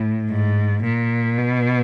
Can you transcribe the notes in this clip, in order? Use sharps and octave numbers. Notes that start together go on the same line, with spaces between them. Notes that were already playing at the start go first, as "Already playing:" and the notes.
Already playing: A2
G#2
A#2
B2